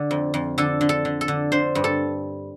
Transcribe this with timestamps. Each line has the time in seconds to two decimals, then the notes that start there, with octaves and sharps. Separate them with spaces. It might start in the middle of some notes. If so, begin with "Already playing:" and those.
Already playing: D3
0.11 F2
0.34 F2
0.58 D3 A4
0.81 D3
0.89 A4
1.05 D3
1.21 A4
1.28 D3
1.52 D3 C5
1.75 G2
1.84 A4